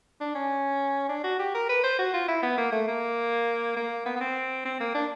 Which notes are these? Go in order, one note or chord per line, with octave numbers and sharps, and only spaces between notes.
D4
C#4
D4
F#4
G4
A#4
B4
C5
F#4
F4
E4
B3
A#3
A3
A#3
A#3
B3
B3
C4
C4
A#3
D4